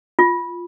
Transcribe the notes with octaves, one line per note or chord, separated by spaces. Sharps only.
F4